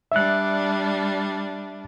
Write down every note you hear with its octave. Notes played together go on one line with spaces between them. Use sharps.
G3 D4 E5 F#6